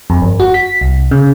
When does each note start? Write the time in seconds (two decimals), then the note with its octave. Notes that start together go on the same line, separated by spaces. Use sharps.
0.10 F2
0.22 G1
0.40 F#4
0.54 B6
0.81 C2
1.11 C#3